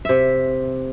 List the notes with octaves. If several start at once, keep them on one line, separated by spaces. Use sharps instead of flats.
C3 E5